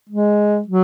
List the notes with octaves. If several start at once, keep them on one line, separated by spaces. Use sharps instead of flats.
G#3
F#3